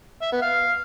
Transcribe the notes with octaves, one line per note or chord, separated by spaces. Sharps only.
E5
B3
F5